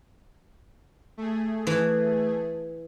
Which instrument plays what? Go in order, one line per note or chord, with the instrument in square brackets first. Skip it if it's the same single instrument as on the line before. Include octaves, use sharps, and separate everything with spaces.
[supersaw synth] A3 G#4
[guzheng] E3